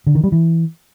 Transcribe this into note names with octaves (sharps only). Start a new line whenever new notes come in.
D3
D#3
G3
E3